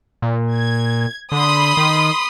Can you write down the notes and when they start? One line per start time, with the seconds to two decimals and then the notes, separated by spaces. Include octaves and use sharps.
0.22 A#2
0.55 G#6
1.32 D3 B5 C6 D#6
1.77 D#3